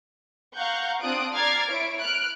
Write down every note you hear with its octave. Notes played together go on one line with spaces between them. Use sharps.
F5 F#5 A#5 C#6 F#6 G6
C4 D4 F4 D#6 F#6 D7
D5 A#5 F6 G#6 A6 C7
E4 C#5 D7
F6 F#6 D7